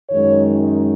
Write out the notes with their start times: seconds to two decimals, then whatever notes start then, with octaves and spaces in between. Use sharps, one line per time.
0.10 F#2 D#3 G#3 C#5